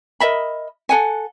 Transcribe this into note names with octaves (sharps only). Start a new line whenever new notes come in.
A#4 D#5 E5 B5
A4 F#5 G#5